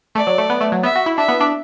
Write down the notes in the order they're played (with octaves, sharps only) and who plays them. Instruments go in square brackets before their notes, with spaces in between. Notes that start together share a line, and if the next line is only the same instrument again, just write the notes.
[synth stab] A3 [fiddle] D5
[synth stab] F#3
A3
B3
A3
F#3
[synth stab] B3 [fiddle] E5
[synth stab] F#4
E4
[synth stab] D4 [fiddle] E5
[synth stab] B3
D4